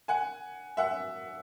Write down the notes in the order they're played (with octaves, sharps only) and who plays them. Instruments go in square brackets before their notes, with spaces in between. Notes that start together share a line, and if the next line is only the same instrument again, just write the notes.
[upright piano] F#5 G#5
E5 F#5